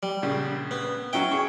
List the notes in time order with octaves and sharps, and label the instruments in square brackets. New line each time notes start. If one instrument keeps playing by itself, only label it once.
[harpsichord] G3
[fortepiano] A#1 C#3
[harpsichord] B3
[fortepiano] F#3 C#4 E4 [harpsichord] G5
[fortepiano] G#4 C#6